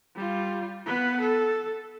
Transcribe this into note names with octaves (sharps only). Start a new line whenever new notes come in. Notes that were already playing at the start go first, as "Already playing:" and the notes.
G3 F4
B3 B4
A4